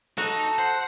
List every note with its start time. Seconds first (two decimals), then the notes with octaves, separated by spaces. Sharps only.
0.18 D#4 F#4 A4
0.59 C5 F#5